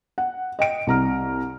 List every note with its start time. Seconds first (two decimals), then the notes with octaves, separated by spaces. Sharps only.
0.18 F#5
0.59 D#5 G5 D7
0.87 C2 A#5 F6